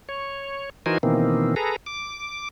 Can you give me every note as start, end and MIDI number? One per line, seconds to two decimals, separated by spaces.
0.09 0.70 73
0.86 0.98 52
0.86 0.98 63
0.86 0.98 66
0.86 0.98 70
0.86 0.98 72
0.86 0.98 80
1.03 1.55 47
1.03 1.55 51
1.03 1.55 52
1.03 1.55 58
1.03 1.55 60
1.56 1.76 68
1.56 1.76 69
1.56 1.76 71
1.56 1.76 82
1.86 2.49 86